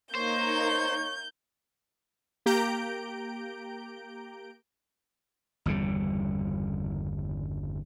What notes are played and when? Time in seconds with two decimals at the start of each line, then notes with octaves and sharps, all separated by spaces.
0.15 A#3 D#4 C5 C#5 G6
2.46 A#3 G4 A#5 G6 D7
5.66 G1 E2 C#3 G3